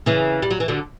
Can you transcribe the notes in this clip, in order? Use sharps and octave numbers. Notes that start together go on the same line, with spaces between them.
C#3 E3
G3
F#3
E3
D3 F#3